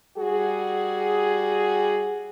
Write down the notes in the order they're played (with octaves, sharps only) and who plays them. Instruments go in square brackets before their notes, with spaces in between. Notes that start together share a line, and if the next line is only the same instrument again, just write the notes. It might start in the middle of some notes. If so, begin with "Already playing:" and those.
[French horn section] G3 F#4 G#4